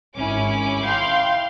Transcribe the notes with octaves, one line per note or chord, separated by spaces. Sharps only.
G#1 C#4 E4 D6
F5 G5 C6